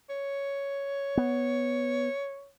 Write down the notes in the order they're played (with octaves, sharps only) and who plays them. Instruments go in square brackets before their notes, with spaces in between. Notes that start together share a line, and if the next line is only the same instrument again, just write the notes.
[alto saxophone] C#5
[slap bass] B3